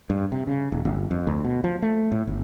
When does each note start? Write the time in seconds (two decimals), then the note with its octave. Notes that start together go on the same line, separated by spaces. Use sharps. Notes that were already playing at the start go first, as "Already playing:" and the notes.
0.10 G2
0.32 C3
0.47 C#3
0.72 D#1
0.85 G1
1.11 F2
1.27 D2
1.45 B2
1.64 F3
1.82 A3
2.12 A2
2.27 G1